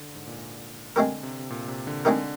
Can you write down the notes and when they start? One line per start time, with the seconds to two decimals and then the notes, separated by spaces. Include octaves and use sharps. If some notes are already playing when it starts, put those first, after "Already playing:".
Already playing: D3
0.15 G#2
0.27 A#2
0.96 D3 G#3 C4 G4 A#4
1.23 C3
1.39 C3
1.50 A#2
1.68 C3
1.87 D3
2.05 D3 G#3 C4 D#4 G4 A#4